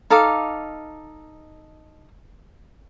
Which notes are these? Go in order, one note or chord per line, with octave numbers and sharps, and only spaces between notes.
D#4 A4 F5 D6